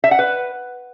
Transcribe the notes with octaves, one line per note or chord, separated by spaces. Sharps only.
E5
F#5
B4